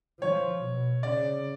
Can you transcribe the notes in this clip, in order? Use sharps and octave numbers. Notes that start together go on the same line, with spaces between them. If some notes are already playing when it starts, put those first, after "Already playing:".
F3 C#5
B2
C#3 D5